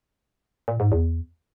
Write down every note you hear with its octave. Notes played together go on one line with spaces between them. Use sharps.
A#2
G#2
E2